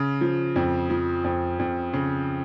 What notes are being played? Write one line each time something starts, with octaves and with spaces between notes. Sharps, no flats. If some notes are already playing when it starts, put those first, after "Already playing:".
Already playing: C#3
F3
F2
F3
F2
F2
C#3